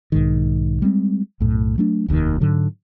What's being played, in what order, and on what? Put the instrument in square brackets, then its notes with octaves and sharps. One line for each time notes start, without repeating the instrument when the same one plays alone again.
[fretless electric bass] B1 G#2 D#3
G3 G#3 C4
B1 F#2 A2
F#3 A3 D4
F1 D#2 B2 D#3
G#2 D3 F#3